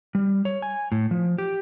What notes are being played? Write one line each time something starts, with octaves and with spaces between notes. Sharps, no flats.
G3
C#5
G#5
A2
F3
G4